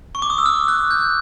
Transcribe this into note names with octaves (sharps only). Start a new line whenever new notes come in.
C#6
D6
D#6
E6
F6
F#6
G6